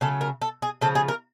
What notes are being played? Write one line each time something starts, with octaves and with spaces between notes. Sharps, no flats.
C#3 F#3 A3 A4
A#4
A4
G#4
C#3 F3 A3 A4
G#4
A#4